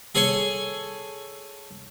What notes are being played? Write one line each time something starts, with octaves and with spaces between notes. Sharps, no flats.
G#4 A4 C#5 G#5